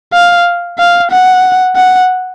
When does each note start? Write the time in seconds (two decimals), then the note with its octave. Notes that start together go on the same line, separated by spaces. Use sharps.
0.13 F5
0.78 F5
1.11 F#5
1.76 F#5